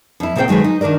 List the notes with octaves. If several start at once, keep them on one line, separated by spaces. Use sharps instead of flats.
F2 E4
A#2 C#3 C4 G4 C5 G5
D#3 F#3 G#3 A4 B4
D#4
D#3 D4 F#4 A#4 D5